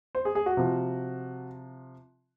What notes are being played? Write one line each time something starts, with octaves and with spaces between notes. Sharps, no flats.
C5
G#4
G#4
F#4
C3 F3